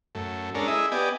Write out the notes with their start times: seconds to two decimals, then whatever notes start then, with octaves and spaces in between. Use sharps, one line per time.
0.15 F#2 A3
0.55 G#3 C#4 D4 A4 A#4
0.67 E4 G#4 D#5 E5
0.92 B3 G4 D5 D#5 G#5